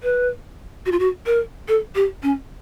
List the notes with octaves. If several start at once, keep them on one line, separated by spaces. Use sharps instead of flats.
B4
F#4
F4
F#4
A#4
A4
G4
C#4